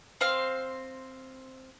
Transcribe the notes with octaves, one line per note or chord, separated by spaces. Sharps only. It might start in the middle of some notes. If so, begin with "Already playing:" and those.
C4 C5 F5